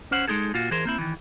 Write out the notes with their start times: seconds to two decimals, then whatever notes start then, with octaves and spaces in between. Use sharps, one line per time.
0.11 C#4 C5 F#5
0.28 G#3 B3 D#4 G#4 A4
0.54 A#2 F4 F#4
0.71 E3 G#4 A#4 C5
0.85 A#3 C4 E4
0.99 D#3 E3